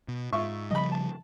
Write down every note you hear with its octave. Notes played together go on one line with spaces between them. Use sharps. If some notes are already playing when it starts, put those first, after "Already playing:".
B2
G#2 F4 E5 C#6
C#3 F3 G3 D#5 B5
A5